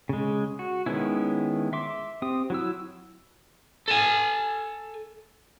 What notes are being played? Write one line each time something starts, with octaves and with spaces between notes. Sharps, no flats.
C#3 G#3
F#4
D#3 G#3 B3 C#4 E4
E5 C6 D6
C4 G4 D#6
F#3 E4 E6
A4 G#5